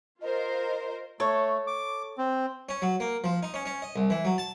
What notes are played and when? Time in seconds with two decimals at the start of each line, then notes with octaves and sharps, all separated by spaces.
0.22 F4 A#4 C5 D#5
1.20 A3 A4 C#5
1.67 D6
2.18 C4
2.69 C#4
2.82 F#3
3.00 A#3
3.24 F3
3.43 D#4
3.54 C#4
3.65 C#4
3.82 D#5
3.96 C2
4.10 E3
4.25 F#3
4.38 A5